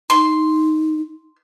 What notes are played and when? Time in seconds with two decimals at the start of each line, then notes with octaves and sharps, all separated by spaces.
0.10 D#4 C6